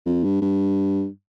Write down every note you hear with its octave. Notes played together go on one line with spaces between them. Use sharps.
F2
G2
G2